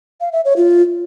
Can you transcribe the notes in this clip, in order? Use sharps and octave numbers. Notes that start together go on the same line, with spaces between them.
F5
E5
C#5
F4